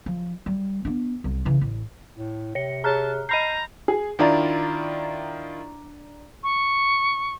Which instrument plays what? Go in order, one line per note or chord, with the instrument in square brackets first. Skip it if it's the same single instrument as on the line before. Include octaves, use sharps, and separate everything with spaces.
[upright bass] F3
G3
B3 D4
C2
C#3 E3
A1
[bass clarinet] A2
[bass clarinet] C3 [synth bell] C#5 C#7
[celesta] G#4 C#5 [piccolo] A5 [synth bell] A#5 F6 F#6
[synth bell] D#5 B5 G6 [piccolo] A#5 [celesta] C7 D#7
[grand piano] G#4
[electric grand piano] D#3 E4 F4 [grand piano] D4 D5 A#5
[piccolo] C#6